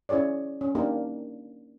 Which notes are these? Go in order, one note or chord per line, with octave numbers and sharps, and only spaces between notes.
C#4 E4 G#4 C#5 D5
C#4
A#3 D4 D#4 G4 A#4